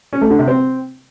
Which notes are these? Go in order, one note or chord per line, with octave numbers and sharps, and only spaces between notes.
C#4
A3
D3
C3
C4